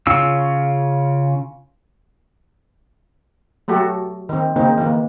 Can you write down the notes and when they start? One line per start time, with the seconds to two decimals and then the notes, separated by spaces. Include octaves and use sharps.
0.07 C#3 C#4 F4 E6
3.68 F#3 A3 F#4 G4 A4
4.29 D#3 C4
4.56 C#3 A#3 C4 D#4
4.78 D#3 E3 A#3